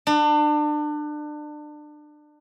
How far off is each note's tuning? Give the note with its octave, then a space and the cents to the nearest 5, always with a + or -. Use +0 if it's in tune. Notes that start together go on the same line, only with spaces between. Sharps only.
D4 +30